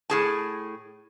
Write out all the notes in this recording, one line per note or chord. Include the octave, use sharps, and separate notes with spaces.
A2 G#4 A5